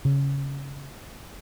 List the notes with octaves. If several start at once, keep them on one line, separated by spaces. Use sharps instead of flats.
C#3